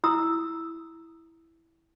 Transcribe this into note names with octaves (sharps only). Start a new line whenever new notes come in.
E4 A#5 D#6 E6